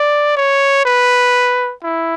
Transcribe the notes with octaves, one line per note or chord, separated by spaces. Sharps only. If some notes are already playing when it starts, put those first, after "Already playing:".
Already playing: D5
C#5
B4
E4